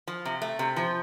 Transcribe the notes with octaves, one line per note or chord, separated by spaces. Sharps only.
F3
C3
A3
C3
F3